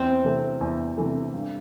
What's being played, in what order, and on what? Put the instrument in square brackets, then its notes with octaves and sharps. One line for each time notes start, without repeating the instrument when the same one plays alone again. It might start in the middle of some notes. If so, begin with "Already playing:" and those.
Already playing: [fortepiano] E2 [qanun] C4
[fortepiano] C3 E3 A3
E2
C3 E3 A3
G2